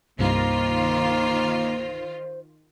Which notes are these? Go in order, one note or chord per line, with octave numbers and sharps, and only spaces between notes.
C2 G2 D#3 A#3 F4 C5